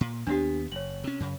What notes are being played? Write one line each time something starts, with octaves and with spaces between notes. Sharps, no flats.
A#2
D#2 A3 B3 D4 G4
F#1 C#5 F#7
C3 C#4
F#2 C#3